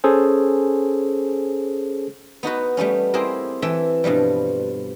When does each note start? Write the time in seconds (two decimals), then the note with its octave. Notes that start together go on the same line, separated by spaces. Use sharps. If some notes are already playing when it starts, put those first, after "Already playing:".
0.04 C#4 G#4 A4 C5
2.43 B3 D#4 F#4 B4
2.77 G3 A3 B3 C#4
3.14 C4 E4 G4 G#4 A#4
3.62 E3 A4 E5 G5
4.04 G2 B2 F3 G3